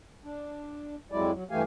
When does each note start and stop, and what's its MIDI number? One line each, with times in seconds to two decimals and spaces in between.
0.24 0.95 62
1.12 1.31 41
1.12 1.31 54
1.12 1.31 56
1.12 1.31 64
1.12 1.31 74
1.33 1.44 54
1.51 1.63 43
1.51 1.63 52
1.51 1.63 57
1.51 1.63 67
1.51 1.63 77
1.51 1.63 80